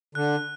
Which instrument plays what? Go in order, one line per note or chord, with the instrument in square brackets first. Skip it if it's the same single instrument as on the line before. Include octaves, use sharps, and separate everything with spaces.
[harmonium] D3 [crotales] F#6